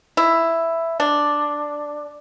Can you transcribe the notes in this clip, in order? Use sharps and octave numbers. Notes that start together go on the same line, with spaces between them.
E4
D4